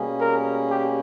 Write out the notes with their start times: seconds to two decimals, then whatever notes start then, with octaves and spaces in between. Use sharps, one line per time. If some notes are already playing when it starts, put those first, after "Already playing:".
Already playing: B2 G3 A#3 C#4 G#4
0.21 A#4
0.71 G4